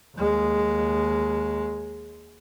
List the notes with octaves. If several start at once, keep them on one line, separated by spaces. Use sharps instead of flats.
D#2 G#3